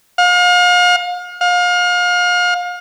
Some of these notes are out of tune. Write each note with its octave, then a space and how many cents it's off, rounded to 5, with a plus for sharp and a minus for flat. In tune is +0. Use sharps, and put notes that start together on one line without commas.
F5 +40
F5 +35